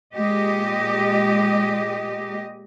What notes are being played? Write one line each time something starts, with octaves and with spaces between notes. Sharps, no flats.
A#2 G#3 G4 D#5